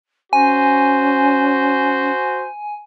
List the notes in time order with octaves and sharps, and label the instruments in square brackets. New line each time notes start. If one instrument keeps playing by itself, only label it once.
[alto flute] C#4 [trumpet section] F#4 C5 [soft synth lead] G#5